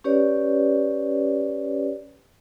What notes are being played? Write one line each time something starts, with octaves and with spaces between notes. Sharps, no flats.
C#4 G4 B4 C#5 D5